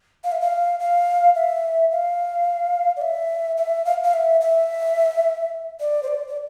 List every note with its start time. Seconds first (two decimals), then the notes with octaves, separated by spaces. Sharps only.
0.24 F5
0.32 E5
0.41 F5
0.80 F5
1.35 E5
1.91 F5
2.97 D5
3.02 E5
3.58 E5
3.85 F5
4.04 F5
4.13 E5
4.41 E5
5.80 D5
6.03 C5
6.08 D5
6.28 D5